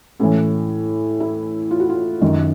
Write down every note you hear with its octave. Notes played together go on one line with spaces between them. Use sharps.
A2 E3 C#4
E4
F4
F#4
F4
F#2 D#3